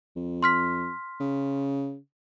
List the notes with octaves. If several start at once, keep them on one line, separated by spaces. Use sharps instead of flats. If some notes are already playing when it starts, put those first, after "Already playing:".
F2
C6 F6 B6
C#3